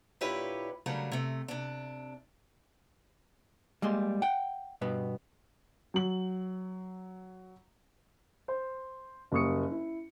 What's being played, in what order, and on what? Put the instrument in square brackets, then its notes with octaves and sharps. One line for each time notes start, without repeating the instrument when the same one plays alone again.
[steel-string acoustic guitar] A#2 D4 E4 G4 B4 C#5
C#3 F#3 G3 A3 D4 A#4
C3 A3
C3 D4
[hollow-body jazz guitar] G3 G#3 A#3 C6
F#5 G5
G2 B2 B3
[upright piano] F#3 F#7
[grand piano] C5
F#1 G3 A#3 C#6 D#6 C#7
E4